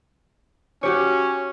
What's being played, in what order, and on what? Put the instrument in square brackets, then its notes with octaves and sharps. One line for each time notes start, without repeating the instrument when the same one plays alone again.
[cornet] C#4 [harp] F#4 G4 C#5